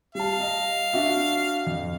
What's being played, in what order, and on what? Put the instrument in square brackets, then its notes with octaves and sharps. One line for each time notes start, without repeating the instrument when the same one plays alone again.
[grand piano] G3 A5 [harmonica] F5
[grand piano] D#5
D4 F#4 E5
F2